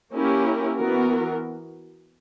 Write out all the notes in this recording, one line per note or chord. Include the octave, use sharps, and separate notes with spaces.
A#3 C#4 E4 G4 A#4
E3 B3 F#4 A#4